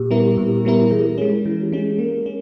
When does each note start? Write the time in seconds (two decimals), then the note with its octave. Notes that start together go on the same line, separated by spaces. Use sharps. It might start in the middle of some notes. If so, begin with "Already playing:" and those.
Already playing: A#2 G4
0.11 G3 B3 E4 A#4
0.37 A#2
0.65 G3 B3 E4 A#4
0.91 E3 G#4
1.06 A#4
1.18 G#3 C#4 G#4
1.32 E4
1.45 E3 E4
1.63 G4
1.72 G#3 C#4
1.81 G#4
1.99 A#3 A#4
2.26 C#4